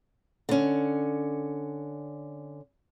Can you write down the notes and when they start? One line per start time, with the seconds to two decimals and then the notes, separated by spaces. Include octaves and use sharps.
0.49 D3 C#4